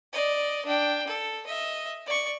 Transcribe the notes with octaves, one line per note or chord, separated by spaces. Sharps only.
D5 D#5
D4 G5
A4
D#5 E5
D5 C#6